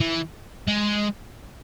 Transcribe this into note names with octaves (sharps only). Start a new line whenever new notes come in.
E3
G#3